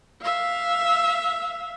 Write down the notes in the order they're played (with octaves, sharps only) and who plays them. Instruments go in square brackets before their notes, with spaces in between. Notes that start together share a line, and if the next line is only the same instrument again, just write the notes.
[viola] E5 F5